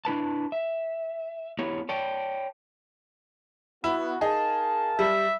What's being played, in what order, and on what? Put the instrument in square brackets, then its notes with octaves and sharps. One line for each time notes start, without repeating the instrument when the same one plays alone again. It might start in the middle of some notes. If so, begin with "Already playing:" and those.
[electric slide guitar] D4 E4 B4 A5
E5
B3 E4 F4 G4 C#5
C#5 D5 G5 A5
[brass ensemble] B3 F#4 [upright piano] E4
[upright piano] D#4 G#4 [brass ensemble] A#4 F5 A5
[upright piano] G3 [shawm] E5